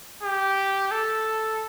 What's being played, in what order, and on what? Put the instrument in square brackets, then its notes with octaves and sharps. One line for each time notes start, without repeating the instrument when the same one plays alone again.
[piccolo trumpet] G4
A4